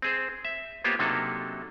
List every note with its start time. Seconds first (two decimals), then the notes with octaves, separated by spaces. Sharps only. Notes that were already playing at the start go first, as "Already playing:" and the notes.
0.02 C4 G#4 C5
0.45 E5
0.84 A#3 B3 F4 G4 C5 C#5
0.99 C3 F#3 A#3 D4 D#4 A4